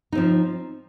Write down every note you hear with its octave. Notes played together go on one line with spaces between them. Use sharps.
F3 C4 D#4